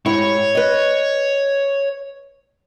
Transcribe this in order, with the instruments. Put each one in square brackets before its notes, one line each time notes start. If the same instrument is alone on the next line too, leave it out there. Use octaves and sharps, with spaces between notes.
[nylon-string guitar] G#2 E4 G4 [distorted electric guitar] C#5
[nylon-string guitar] B4 D#5